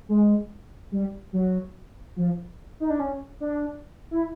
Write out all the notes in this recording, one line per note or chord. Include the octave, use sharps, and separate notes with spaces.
G#3
G3
F#3
F3
D#4
D4
C#4
D4
E4